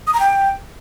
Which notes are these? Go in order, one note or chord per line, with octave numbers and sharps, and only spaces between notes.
D#6
A#5
G5